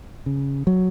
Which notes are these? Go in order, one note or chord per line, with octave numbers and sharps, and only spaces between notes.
C#3
F#3